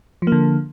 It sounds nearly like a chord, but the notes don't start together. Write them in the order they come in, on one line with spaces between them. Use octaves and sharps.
F3 A#3 D3